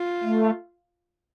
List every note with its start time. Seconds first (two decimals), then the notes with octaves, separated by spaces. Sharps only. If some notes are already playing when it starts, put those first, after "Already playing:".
Already playing: F4
0.24 A3